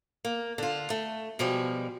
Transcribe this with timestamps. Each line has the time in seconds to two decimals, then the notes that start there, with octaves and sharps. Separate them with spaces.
0.25 A#3
0.58 D3 F4
0.90 A3
1.39 B2 F3 G3 G#3